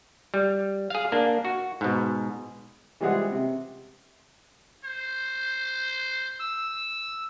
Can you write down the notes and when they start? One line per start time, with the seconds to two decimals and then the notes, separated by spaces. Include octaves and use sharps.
0.34 G3
0.90 G#4 F5
1.12 A#3 D4
1.45 F#4
1.81 G#2 B2
3.00 E3 G3 G#3 F4 G#4 F#5
3.32 C3
4.84 C5
6.40 E6